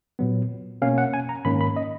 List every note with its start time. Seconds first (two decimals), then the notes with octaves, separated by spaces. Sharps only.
0.19 A#2 F#3 B3
0.82 B2 A#3 C#4 F5
0.98 F#5
1.14 G#5
1.29 A#5
1.45 G#2 D#3 A#3 C#4 B5
1.61 B5
1.76 D#5